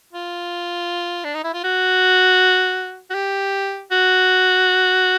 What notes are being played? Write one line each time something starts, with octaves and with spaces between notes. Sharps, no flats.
F4
D4
D#4
E4
F4
F#4
F#4
G4
F#4